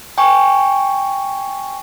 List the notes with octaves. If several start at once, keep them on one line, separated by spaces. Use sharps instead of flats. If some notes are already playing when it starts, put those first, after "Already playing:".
G5 G#5 C#6